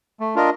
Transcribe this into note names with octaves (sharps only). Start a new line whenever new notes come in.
A3
D4 F4 A#4 D#5